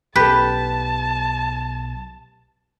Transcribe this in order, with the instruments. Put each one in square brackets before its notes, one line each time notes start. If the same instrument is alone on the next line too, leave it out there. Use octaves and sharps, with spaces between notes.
[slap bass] B1 A2 [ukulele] G4 A4 [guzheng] B4 [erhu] A5